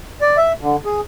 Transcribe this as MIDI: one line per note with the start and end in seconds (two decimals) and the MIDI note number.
0.21 0.37 74
0.37 0.53 76
0.61 0.76 50
0.85 1.01 68